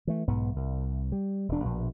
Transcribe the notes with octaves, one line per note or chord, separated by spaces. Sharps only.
E3 A3
B1 G#2 B3
C2
G3
E1 D4
A#1 B2